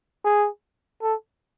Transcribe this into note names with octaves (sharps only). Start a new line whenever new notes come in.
G#4
A4